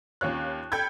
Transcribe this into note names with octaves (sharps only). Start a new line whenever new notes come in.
D#2 C#4 F4 C#5 F#6
A4 G5 B5 G6 G#6